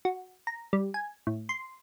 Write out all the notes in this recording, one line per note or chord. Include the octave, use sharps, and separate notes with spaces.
F#4
A#5
G3
G#5
A2
C6